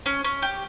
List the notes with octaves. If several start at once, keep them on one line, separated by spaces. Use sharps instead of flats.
C#4
C#4
G4